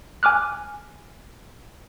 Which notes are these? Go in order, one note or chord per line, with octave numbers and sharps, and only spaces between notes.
G#5 D6 F6 F#6